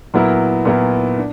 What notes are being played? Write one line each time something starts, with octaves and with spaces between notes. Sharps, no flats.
A#2 F#3 B3 E4 A#4
A#2 F#3 B3 E4 A#4
D4